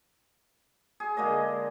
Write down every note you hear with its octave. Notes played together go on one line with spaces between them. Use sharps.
G#4
D3 G#3 A#3 D#5